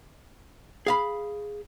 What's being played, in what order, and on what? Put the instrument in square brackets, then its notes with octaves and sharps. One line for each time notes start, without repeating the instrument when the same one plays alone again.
[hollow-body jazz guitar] G#4 F5 B5